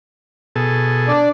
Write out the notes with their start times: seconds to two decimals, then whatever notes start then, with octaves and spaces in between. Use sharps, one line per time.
0.56 B2 G#4 A4
1.08 D4 D5